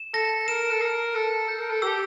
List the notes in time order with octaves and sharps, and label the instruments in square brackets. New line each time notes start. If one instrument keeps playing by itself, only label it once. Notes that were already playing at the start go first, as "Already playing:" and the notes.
Already playing: [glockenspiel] E7
[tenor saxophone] A4 [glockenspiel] A#6
[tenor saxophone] A#4 [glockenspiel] E7
[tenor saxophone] A4
[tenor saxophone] A#4 [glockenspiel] A#6
[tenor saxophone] A4 [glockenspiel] E6
[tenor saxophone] A4 [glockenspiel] G6
[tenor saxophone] A#4
A4
[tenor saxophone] G4 [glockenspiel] E6